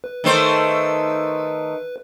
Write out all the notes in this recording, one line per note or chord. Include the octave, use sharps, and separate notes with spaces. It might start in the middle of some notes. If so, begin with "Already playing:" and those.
B4
D#3 A3 C5